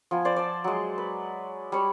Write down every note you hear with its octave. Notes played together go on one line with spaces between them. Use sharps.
F3 B3 G#5
C5 D5
D5 A5
F#3 G#3
B4
G3 C#5